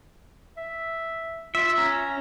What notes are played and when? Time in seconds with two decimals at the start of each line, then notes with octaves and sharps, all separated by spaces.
0.57 E5
1.55 F4 E5
1.78 C#4 A#5